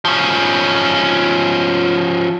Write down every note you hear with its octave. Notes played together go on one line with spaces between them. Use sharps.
F3 C#4